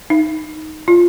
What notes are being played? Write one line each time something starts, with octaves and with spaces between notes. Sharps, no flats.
D#4
F4